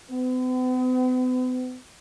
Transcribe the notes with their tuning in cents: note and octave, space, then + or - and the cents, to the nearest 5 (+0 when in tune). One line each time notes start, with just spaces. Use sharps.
B3 +45